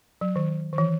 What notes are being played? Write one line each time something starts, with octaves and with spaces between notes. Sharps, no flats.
F#3
D#3
D#3
E3